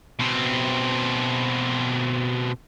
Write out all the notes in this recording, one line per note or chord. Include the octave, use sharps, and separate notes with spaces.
B2 C4